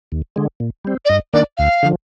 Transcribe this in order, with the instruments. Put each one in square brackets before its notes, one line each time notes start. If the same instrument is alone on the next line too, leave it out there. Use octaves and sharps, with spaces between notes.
[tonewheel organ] D#2
D3 G#3
A#2
G3 C4
[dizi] D5
[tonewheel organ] G2 [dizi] D#5
[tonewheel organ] D#3 A#3 D4 [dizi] D5
[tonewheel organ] D2 [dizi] F5
[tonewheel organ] D3 F3